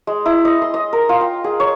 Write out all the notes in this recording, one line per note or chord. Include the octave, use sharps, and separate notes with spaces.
G#3
E4
D#5
C6
D#5
A#4
F4
G5
G#4
C#5